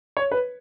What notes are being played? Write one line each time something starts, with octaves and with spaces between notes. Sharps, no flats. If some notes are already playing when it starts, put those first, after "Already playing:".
C#5
B4